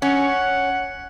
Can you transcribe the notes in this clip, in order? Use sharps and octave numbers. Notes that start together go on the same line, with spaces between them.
C#4 F#5